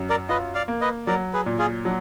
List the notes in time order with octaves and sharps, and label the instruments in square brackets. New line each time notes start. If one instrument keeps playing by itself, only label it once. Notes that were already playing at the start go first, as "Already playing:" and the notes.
Already playing: [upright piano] F#2
[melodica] A#4 D5
[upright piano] F4 [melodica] B4 D#5
[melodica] D5 F5
[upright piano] A#3
[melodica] B4 D#5
[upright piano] F#3 [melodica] A#4 D5
[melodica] G#4 B4
[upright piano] A#2
[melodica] F4 G#4
[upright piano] F#3 [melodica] D4